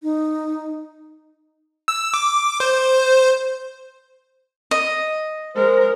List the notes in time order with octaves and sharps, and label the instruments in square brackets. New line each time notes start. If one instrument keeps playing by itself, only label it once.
[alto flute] D#4
[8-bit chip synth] E6
D6
C5
[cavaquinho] D#5
[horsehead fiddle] G#3 A#4 [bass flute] C5